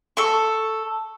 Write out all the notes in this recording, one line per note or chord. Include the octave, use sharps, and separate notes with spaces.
A4 C#6